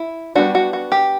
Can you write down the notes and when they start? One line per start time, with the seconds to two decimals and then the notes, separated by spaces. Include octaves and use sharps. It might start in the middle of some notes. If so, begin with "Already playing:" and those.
Already playing: E4
0.35 G3 B3 D4 F#4
0.55 F#4
0.73 F#4
0.92 G4